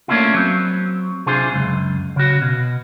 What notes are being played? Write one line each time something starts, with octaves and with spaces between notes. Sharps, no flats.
A3 A#3 C#4 D4 E4 F4
F#3 C4
C3 D4 F4 G#4 C5
C#2 F#2
C#3 F#4
B2